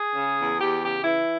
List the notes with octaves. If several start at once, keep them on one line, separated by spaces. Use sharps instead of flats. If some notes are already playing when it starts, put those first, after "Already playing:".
Already playing: G#4
C#3
E2
E2 G4
C#3 G4
E3 E4